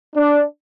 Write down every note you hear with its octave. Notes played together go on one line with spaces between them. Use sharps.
D4